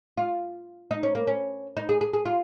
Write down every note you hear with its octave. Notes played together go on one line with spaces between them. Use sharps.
F4
D#4
C#4
A#3
C#4
D#4
G#4
G#4
G#4
F4